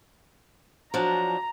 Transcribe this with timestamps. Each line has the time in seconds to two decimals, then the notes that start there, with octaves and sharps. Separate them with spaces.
0.94 F3 F#3 D4 A#5